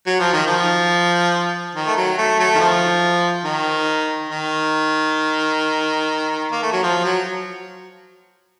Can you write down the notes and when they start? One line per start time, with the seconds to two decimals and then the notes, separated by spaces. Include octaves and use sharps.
0.07 F#3
0.20 F3
0.33 D#3
0.47 F3
1.75 D#3
1.87 A3
1.97 F#3
2.18 A3
2.39 F#3 A3
2.55 D#3
2.60 F3
3.45 D#3
4.29 D#3
6.52 A#3
6.62 A3
6.73 F#3
6.83 F3
7.04 F#3